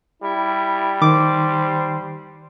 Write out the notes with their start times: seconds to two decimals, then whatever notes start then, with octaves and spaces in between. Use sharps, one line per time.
0.23 G3 E4
1.02 D#3 C5 D6